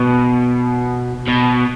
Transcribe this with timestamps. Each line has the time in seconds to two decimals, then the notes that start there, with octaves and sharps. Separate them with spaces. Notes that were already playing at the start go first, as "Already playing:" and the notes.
Already playing: B2
1.28 B2